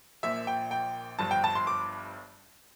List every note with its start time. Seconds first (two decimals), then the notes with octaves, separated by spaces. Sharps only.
0.23 A#1 A#2 F3 E5
0.47 G5
0.71 G5
1.19 G1 G2 F3 A5
1.31 G5
1.44 A5
1.55 C6
1.67 D6